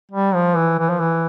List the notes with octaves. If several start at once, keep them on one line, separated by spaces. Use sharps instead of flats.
G3
F3
E3
E3
F3
E3